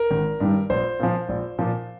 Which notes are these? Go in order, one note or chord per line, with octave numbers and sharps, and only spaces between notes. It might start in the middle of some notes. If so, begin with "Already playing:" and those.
Already playing: A#4
G#1
G2 D#3 G3
A#1 C5
A#2 F3
A#1
A#2 F3